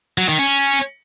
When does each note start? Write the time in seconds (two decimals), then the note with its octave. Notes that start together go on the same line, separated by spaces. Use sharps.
0.18 F#3
0.28 D#3
0.39 C#4